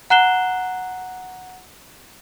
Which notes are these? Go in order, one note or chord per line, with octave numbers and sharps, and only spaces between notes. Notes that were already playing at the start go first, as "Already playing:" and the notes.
F#5 A#5 F#6 C7 E7 G7